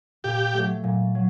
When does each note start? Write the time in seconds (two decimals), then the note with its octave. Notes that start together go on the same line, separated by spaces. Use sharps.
0.24 A#2 G4
0.54 F#3 A3
0.84 A#2
1.15 F#3